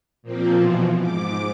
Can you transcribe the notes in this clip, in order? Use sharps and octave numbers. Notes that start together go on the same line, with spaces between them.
A#2 F3 A#3 C4
B2 E3 F3
G#2 D6